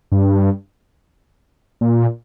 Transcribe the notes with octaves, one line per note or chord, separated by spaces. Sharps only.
G2
A#2